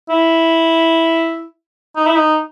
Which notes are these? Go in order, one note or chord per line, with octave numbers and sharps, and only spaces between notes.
E4
D#4
E4
D#4